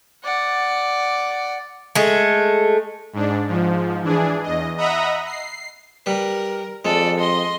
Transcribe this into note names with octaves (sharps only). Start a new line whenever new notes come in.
D5 F#5
G#3 A3
G#2 D4
G#2 F3
E3 D4 G#4
E2 D#5
D#5 E5 F#5 A#5 B5 D#6
C7
G3 A#4 B4
F2 G#3 A4 D5
D#5 C6